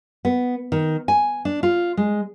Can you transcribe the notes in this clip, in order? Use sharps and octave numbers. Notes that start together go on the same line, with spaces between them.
B3
D#3
G#5
D4
F4
G#3